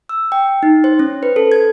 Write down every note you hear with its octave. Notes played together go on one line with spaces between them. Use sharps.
E6
G5
D#4
C5
C#4
B4
A4
G#6